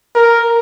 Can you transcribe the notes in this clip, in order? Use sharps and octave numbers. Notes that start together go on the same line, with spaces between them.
A#4